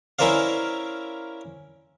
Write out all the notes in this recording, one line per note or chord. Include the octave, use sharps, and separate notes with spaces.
C#4 E4 A#4 C5 D5 F5